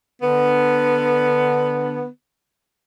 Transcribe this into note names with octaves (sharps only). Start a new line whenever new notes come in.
D3 B3